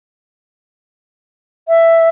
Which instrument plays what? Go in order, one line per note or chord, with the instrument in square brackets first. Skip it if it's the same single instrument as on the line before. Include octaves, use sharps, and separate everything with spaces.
[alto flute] E5